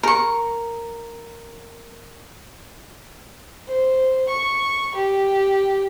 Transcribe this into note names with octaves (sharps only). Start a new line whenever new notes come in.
A#4 C#6
C5
C#6
G4